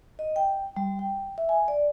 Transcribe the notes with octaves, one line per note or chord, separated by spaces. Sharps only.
D#5
G5
G3
G5
E5
G#5
D5